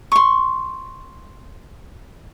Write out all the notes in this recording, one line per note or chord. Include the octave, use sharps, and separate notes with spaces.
C6 C#6